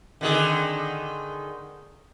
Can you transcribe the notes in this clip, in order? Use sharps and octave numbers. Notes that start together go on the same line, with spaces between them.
D3 D#3 G#4